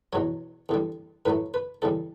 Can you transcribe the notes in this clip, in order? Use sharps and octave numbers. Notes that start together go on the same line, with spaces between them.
E2 B2 F#3 C#5
E2 D3 G3
A2 F#3 A3 B4
B4
E2 C#3 G3 A4